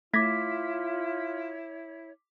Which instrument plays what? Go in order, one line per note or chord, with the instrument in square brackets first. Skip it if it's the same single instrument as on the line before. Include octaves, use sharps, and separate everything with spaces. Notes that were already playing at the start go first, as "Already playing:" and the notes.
[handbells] A3 G#6 A#6 [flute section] E4 C#5 [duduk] F4 [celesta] D6 B6